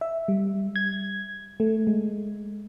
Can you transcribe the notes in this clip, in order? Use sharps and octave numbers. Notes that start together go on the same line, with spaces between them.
E5
G3
G#6
A3
G#3